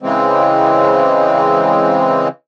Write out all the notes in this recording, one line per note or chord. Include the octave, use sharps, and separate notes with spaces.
C#3 E3 G#3 C4